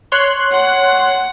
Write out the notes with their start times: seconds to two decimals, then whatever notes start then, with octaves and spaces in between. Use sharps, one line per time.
0.12 C#5 C6 F#6
0.51 F#5